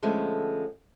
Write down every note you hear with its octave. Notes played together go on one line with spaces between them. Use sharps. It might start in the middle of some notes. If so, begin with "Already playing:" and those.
D3 F3 G#3 A3 B3 C#4